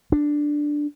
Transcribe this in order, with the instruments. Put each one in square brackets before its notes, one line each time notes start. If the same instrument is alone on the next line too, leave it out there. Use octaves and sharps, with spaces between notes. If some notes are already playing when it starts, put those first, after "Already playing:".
[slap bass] D4